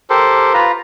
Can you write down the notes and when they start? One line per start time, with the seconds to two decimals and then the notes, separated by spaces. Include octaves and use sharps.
0.10 G4 A4 A#4 C5
0.54 F4 B4 A#5